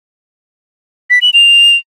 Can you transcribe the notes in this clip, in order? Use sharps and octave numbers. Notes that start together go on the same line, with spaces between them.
B6
F#7
F7